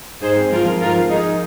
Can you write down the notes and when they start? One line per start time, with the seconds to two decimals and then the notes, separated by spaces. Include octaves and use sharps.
0.21 G#2 G#4 C5
0.36 C4
0.51 F3 F4 A#4
0.65 F3
0.80 G#2 F4 A#4
0.95 F3
1.10 F3 D#4 G#4